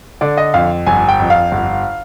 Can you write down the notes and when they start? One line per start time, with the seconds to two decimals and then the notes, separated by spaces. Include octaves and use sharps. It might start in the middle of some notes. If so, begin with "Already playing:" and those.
0.21 D3 D5
0.37 D#5
0.54 F2 F5
0.86 G1 G#5
1.09 G5
1.19 F2
1.30 F5
1.52 G1